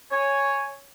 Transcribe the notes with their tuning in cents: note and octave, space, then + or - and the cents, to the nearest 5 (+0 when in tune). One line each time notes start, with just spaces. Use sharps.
C#5 +0 G#5 +0